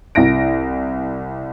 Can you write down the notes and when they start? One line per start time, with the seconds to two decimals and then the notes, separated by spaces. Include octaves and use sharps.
0.15 C2 E4 A#6 D7